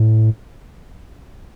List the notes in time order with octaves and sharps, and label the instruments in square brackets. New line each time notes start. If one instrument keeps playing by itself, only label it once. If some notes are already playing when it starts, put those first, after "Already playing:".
Already playing: [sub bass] A2